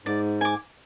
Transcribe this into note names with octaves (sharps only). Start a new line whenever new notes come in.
G#2 D5
G#5 D6